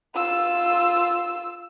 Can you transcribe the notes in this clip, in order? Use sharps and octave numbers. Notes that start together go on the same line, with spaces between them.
F4 E6